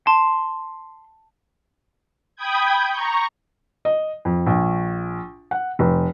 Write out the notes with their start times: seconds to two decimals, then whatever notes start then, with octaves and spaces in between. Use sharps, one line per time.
0.07 A5 C6
2.36 G5 B5 D#6 G6 G#6
2.91 A#5 C#6
3.85 D#5
4.25 F2
4.46 A#1
5.51 F#5
5.79 F1